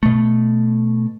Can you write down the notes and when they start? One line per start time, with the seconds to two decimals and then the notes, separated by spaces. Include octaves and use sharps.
0.03 B2 A3